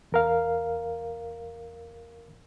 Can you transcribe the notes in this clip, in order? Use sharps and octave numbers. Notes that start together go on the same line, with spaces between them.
E2 A#4 F5